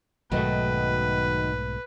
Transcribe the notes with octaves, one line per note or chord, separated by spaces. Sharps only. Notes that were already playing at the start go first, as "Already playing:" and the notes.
B1 G#2 B2 D#3 F#3 A3 B4